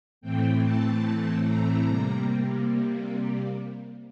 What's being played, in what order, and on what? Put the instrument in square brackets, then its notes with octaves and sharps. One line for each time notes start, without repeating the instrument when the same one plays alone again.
[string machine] A2 E3 A3 C4 G5
A5
A#5
C3 G3 A#3